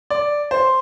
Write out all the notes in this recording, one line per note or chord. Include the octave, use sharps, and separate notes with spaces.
D5
C5